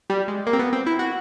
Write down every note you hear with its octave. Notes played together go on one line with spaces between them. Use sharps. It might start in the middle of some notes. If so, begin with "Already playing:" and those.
G3
G#3
A#3
C4
B3
C4
E4
F#4